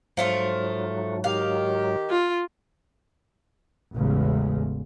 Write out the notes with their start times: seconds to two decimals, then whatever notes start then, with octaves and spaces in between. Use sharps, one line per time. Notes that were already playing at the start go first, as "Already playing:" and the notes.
0.17 G#2 F3 F#3 A3 F4
1.24 D#3 G4 F5
2.10 F4
3.95 A1 E2 C#3 G#3